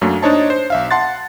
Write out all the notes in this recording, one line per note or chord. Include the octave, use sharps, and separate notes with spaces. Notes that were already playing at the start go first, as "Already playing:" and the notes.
F#2 F#3 A3 A#3 D4
D4 D#4 C5 C#5 D#5 A5
C5
B1 E5 F5
F#5 A5 C6 F#6 A6